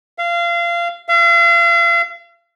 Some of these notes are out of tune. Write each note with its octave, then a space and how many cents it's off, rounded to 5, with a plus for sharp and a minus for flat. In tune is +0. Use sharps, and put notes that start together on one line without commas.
F5 -25
F5 -40